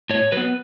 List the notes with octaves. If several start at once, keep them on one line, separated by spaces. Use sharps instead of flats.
A2 C#5
F#3 B3 B4